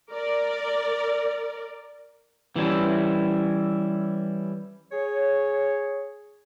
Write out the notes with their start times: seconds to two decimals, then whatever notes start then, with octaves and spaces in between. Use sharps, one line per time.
0.12 A#4 D5
2.56 E3 G3 C#4 E4
4.92 G#4 C#5